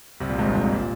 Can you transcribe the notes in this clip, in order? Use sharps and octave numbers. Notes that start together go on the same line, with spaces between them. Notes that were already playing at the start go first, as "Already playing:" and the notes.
C2 C3
A#1 A#2
G#1 G#2
G1 G2
F2
G#1 G#2
A#2